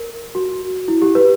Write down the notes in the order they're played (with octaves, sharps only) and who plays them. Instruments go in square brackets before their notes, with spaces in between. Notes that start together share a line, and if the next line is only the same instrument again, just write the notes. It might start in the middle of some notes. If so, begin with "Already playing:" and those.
Already playing: [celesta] A#4
F#4
E4
G4
B4